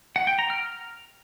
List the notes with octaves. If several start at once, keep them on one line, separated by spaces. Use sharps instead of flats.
F#5
G5
A#5
F6